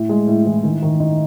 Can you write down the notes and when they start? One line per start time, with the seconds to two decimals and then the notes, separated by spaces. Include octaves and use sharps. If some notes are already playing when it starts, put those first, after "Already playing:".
Already playing: A2
0.09 G#3
0.27 A2
0.45 E3
0.63 D#3
0.82 D#3
1.00 D#4